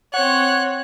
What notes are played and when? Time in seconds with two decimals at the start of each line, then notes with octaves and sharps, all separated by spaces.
0.14 C4 C#5 F#5 F#6